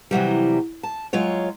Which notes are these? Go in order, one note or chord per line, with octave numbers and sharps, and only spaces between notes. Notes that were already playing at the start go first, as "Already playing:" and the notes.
C3 E3 F#3 G3
A5
F#3 G#3 F4 C#5